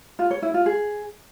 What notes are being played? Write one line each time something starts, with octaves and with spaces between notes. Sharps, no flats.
F4
C#5
E4
F4
G#4